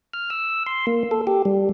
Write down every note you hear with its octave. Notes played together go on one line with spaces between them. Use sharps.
F6
E6
C6
A#3
A4
G4
G3